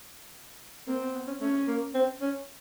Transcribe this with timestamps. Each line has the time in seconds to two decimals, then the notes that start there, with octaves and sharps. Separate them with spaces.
0.88 A#3 C4
1.01 B3
1.14 B3
1.27 C#4
1.41 A3 C#4
1.68 A#3
1.95 C4
2.22 C#4